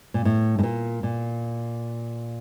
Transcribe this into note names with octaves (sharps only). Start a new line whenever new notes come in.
A#2
A2
A2
A#2
A#2